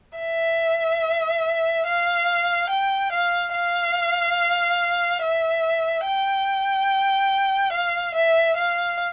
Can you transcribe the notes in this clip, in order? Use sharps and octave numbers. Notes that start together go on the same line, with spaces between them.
E5
F5
G5
F5
F5
E5
G5
F5
E5
F5